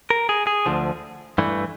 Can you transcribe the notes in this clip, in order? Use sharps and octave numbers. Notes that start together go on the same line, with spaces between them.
A#4
G#4
G#4
D2 D3 F3
G2 E3 A3